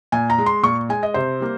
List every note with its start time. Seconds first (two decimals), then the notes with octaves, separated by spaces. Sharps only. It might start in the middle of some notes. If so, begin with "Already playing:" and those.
0.12 A#2 G#5
0.30 A#5
0.38 G#3
0.46 C6
0.63 A#2 C#6
0.89 G#3 G#5
1.03 D#5
1.14 C3 C5
1.40 G3 A#3